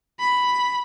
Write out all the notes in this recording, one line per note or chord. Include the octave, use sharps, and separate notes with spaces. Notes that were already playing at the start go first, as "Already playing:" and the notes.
B5